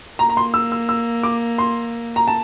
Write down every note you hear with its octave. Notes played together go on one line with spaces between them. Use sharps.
A#3 A#5
A#5
C6
E6
E6
E6
D6
C6
A#5
A5